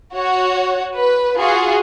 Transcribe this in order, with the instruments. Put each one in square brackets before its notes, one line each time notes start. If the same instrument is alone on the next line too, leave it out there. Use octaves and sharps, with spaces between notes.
[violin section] F#4 C#5
B4
F4 F#4 G#4